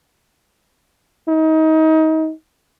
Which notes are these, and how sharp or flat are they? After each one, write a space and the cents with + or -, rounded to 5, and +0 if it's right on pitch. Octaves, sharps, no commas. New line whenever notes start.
D#4 +25